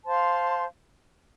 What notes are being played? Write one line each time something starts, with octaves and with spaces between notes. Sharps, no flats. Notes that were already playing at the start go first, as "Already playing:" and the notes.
C5 F5 A5 C6